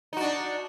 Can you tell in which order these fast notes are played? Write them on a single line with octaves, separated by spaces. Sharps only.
D#4 F#4 D4